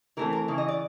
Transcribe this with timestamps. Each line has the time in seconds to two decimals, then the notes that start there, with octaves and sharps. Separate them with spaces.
0.17 E3 A3 C4 A#4
0.33 A#4
0.48 C#3 E3
0.58 D#5
0.68 D5